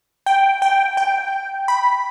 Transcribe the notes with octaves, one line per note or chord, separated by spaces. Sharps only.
G5
G5
G5
B5